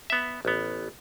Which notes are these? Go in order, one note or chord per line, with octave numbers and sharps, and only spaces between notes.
B3 E5
A1 B3